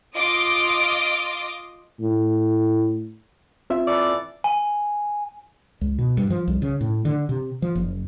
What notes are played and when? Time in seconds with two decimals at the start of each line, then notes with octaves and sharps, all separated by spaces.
0.15 F4 D#5 C6 D6 D#6 D7
2.01 A2
3.70 C4 F4 E5
3.88 E3 A4 D5
4.44 G#5
5.81 C#2
5.98 B2
6.17 G2
6.30 F3
6.47 C2
6.62 C#3
6.81 A2
7.05 D3
7.29 C3
7.62 F3
7.75 F#1